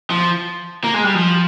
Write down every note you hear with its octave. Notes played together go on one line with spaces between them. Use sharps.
F3
A#3
G#3
G3
F3